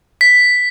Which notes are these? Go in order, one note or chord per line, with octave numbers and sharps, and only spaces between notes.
B6